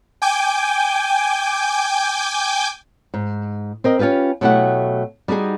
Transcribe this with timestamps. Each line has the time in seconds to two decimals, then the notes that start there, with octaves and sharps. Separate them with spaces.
0.22 G5 G#5 D6 G6
3.14 G#2
3.84 C4 A#4 D#5
3.99 C#4 D#4 F4 G4 B4
4.41 B2 F#3 A3 E4 G4 F#5
5.28 G3 D#4 F#4 G#4